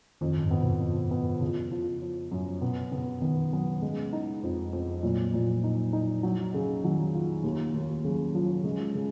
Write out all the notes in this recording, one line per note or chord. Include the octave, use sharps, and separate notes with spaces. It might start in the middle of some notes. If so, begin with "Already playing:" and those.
F2 D#3
F#2
G#2
B3
B2
F3
B3
C#3 F3
F3
F3
F#2
B2 B3
C#3 B3
D#3 B3
F#3 B3
C#3 G#3
D#4
F2
F2
A#2 F#3
A#2 F3
D#4
D#4
F#3
C#3
D#3 F#3
F4
D#2
D#2
C#3 F#3
F3 F#3
C#3 G#3
C#3